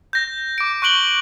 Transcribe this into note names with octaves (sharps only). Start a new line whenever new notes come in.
G6 A#6
D6 D7
C#6 F#6 D7 F#7 G7